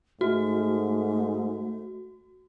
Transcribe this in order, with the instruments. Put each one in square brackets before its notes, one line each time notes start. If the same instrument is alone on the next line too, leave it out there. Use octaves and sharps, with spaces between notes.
[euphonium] G#2 [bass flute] A3 [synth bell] F#4